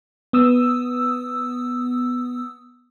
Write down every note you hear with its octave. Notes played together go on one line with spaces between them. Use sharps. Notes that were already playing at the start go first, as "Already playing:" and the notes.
B3 D#6 E6